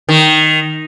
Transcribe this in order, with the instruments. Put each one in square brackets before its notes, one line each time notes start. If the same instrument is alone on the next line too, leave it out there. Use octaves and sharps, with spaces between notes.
[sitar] D#3